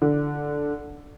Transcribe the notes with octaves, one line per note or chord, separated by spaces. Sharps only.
D3